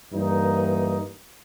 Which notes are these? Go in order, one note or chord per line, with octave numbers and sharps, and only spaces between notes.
G2 E3 A#3 D#4